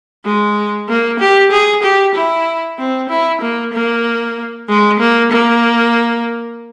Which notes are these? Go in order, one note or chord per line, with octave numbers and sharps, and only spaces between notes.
G#3
A#3
G4
G#4
G4
E4
C4
E4
A#3
A#3
G#3
A#3
A#3